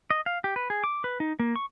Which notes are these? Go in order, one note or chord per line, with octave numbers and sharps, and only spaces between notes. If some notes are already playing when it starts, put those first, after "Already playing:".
D#5
F5
G4
B4
G#4
D6
B4
D#4
A#3
C#6